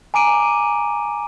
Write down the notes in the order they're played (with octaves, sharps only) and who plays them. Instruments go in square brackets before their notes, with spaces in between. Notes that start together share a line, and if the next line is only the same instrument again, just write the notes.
[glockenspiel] G#5 A#5 D6 D7 D#7